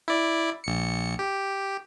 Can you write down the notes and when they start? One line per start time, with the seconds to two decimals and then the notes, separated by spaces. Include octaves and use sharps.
0.08 E4 D5
0.64 A#1 C#7
1.19 G4